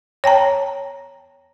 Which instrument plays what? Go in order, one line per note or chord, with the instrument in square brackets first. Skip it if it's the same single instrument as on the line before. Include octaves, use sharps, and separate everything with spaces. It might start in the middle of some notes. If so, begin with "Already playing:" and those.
[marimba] C#5 G5 A5 A#5